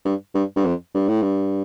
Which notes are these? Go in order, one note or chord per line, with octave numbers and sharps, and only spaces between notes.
G2
G2
G2
F2
G2
A2
G2